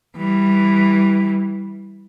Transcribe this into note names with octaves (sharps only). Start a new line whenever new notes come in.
E3 G3